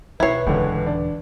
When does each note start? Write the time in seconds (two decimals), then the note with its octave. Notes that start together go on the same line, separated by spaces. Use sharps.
0.20 B1 E4 B4 C#5 G#6 C7
0.47 D#1 C#2 D3 E3
0.86 D4